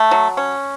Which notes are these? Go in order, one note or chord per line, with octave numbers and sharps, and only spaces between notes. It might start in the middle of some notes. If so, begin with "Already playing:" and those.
Already playing: A3
F#3
C#4